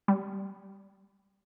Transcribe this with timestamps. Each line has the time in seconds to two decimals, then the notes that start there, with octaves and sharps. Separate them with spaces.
0.08 G3